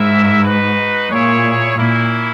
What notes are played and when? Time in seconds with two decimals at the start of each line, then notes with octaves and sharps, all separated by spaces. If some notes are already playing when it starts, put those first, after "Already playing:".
Already playing: G#2 E4 A#4 E5
0.43 D#4 F#4 B4
1.10 A#2 E4 G#4 C#5
1.77 A#2 A#3 C#4 E4